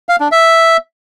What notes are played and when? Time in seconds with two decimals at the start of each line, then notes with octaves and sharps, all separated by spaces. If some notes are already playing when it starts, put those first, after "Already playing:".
0.09 F5
0.20 D4
0.32 E5